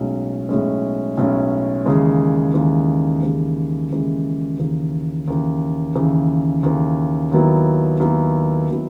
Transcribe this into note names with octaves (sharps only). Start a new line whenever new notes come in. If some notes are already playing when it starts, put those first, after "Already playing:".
Already playing: B1 A2 G#3 C#4
B1 A2 G#3 C#4
B1 A2 G#3 C#4
D#2 C#3 E3 G#3
D#2 C#3 E3 G#3
D#2 C#3 E3 G#3
D#2 C#3 E3 G#3
D#2 C#3 E3
D#2 C#3 E3
D#2 C#3 E3
D#2 C#3 E3
D#2 D#3 F#3 B3 E4
D#2 D#3 F#3 B3 E4
D#3 F#3 B3 E4